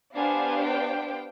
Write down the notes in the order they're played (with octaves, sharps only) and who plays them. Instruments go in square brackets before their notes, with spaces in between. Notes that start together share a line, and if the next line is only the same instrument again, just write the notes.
[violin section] B3 D4 G4 C5 F5 [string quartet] G#5
[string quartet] G5